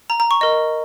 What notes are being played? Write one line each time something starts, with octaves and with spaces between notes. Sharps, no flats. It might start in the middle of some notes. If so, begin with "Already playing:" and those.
A#5
A#5
C#6
A#4 D#5